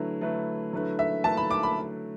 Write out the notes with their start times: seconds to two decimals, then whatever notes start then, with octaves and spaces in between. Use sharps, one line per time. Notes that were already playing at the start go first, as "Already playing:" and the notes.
Already playing: D3 F#3 A3 E4 B4
0.21 D3 F#3 A3 E4 B4
0.73 D3 F#3 A3 E4 B4
0.99 E5
1.24 D3 F#3 A3 E4 B4 A5
1.37 B5
1.51 D6
1.63 B5